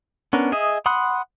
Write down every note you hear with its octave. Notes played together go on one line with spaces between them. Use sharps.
B3 C#4 D4 A#4
G#4 D#5 E5
F#5 B5 C6 D#6 F#6